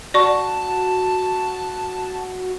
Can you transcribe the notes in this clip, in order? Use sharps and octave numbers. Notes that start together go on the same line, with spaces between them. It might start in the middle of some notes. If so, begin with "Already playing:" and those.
F#4 D5 A5 C#6